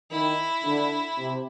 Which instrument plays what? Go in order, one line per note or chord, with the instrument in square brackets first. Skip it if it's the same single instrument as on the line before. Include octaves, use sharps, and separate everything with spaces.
[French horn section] D#3 [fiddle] E4
[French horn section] D3
C3